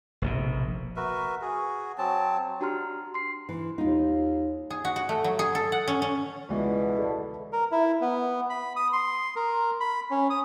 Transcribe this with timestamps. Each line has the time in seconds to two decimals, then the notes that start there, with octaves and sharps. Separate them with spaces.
0.22 F1 A#1 B2
0.96 F#4 A#4 B4 E5
1.41 F#4 G#4
1.98 F#3 C4 A5
2.61 D4 F#4 G4 A#5 C6 F6
3.14 C6 C7
3.49 E3
3.78 D#2 D#4 F4
4.70 G#4
4.85 F#4
4.96 F#4
5.09 A3
5.24 F#3
5.39 G#4
5.55 A4
5.72 F#5
5.88 C#4
6.02 C#4
6.49 C#2 B2 D3 E3 G#3
6.99 A4 D5 A5
7.53 A#4
7.71 E4
8.01 B3
8.50 B5
8.76 D#6
8.93 C6
9.36 A#4
9.80 B5
10.11 C#4
10.30 D#6